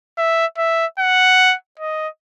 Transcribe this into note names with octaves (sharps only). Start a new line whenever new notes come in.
E5
E5
F#5
D#5